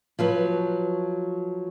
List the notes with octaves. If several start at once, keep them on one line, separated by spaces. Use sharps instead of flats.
F3 F#3 B4